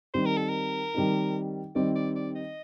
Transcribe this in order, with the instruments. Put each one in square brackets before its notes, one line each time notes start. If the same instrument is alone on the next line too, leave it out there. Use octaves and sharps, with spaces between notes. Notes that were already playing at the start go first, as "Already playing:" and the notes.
[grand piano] D#3 G3 C4 D#4 [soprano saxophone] C5
[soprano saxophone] A#4
A4
A#4
[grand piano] D#3 G3 C4 D#4
[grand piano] D#3 G3 C4 D#4 [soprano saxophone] D5
[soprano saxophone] D5
D5
D#5